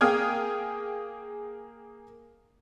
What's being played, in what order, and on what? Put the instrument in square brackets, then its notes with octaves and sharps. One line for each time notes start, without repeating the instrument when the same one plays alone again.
[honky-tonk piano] A#3 G#4 G5 D#6 F6 G#6